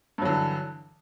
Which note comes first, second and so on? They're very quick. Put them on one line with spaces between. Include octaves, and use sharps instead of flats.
G2 F#3 D3 E3